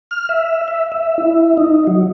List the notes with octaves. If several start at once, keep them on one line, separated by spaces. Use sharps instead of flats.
F6
E5
E5
E5
E4
D#4
F#3